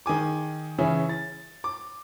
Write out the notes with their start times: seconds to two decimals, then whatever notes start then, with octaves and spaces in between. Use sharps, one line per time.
0.06 D#3 G#4 G#5 D6
0.78 C#3 E3 C#4 E4 G#4
1.09 A6
1.64 D6